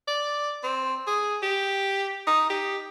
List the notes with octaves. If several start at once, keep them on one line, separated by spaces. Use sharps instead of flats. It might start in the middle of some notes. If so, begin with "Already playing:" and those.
D5
C4
G#4
G4
D#4
G4